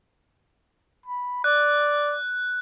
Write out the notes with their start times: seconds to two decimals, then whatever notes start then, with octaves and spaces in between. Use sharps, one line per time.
1.06 B5
1.44 D5 F#6